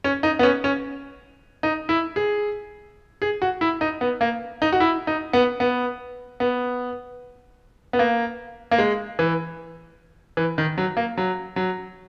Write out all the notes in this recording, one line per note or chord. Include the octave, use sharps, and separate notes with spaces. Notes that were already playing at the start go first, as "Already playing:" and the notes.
C#4
D#4
B3
C#4
C#4
D#4
E4
G#4
G#4
F#4
E4
D#4
B3
A#3
D#4
F#4
E4
D#4
B3
B3
B3
B3
A#3
A#3
G#3
E3
E3
D#3
F#3
A#3
F#3
F#3